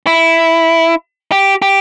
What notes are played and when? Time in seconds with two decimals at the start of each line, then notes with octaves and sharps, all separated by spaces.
0.07 E4
1.32 G4
1.62 G4